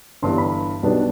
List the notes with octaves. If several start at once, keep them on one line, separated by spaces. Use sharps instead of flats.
G1 G2 E3 C6
B5
B1 B2 G3 B3 D4